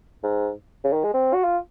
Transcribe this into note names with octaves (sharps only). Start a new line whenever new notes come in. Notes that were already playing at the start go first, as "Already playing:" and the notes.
G#2
C#3
D#3
G#3
C4
F#4
F4